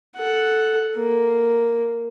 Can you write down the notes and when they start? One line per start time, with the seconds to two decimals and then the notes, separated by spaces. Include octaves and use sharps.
0.16 A4 F#5
0.95 A#3